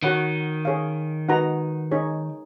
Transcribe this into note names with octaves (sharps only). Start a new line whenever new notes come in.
D#3 F#4 C#5 F#5 B5
G#4 C#5 F5
D#4 F#4 B4 F#5 A#5
D#4 G#4 C#5